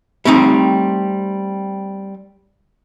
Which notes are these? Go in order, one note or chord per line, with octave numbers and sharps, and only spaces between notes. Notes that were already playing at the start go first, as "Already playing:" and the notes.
G3 A3 C4 D#4